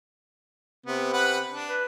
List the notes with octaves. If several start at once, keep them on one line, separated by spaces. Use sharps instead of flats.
C3 B3
B4 F#5 B5
D4
B4